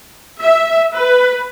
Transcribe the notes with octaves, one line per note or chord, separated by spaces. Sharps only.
E5
B4